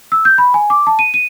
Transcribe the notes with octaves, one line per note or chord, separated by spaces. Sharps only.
E6
G6
B5
G#5
D6
A5
D#7
D#7